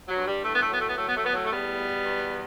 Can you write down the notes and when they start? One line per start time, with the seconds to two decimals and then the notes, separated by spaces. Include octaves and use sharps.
0.08 F#3
0.17 G2
0.26 G3
0.44 A2 A3
0.53 B3
0.62 A3
0.70 F#3 B3
0.80 A3
0.88 B3
0.97 F#3 A3
1.07 B3
1.16 A3
1.25 A2 B3
1.33 F#3 A3
1.44 A3
1.51 E2 G3 B3
1.77 B2
2.05 E2